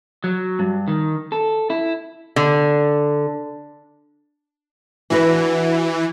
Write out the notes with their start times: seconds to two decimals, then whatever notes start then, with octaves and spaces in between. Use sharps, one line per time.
0.24 F#3
0.59 G2
0.88 D#3
1.32 A4
1.70 E4
2.36 D3
5.10 E3 D4 F#4 B4